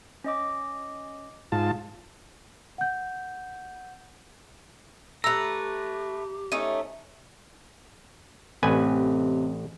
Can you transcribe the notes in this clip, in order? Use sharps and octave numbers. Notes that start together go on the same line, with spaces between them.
C#4 D#5 D6
G#2 F4 A5
F#5 G6
A3 G4 B4 A#5 E6 F7
A3 C#4 D#4 D#7
A1 C3 B4 G#5